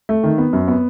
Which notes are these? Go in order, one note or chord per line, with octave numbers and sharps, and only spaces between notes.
A3
D#3
B3
F#2
B3